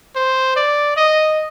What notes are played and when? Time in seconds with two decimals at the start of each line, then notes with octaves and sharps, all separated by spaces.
0.16 C5
0.56 D5
0.97 D#5